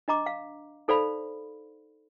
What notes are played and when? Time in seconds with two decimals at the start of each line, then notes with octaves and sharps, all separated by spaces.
0.08 D4 D#5 A#5 D6
0.26 F5
0.88 D#4 A4 C5 D5 F5 B5